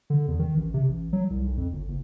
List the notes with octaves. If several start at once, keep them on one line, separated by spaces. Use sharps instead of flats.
D3
E2
D#3
A1
C3
A1
F#3
C2
B1
F2
G1
F#1